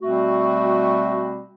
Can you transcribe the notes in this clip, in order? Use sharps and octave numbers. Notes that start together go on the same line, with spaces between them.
B2 G3 A3 C4 F#4